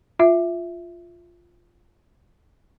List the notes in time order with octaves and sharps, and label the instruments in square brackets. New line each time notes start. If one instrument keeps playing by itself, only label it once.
[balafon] F4 E5